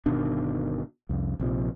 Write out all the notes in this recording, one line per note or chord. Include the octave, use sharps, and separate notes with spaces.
G1 B2 D#3 D4
C2 F2
A#1 C3 F3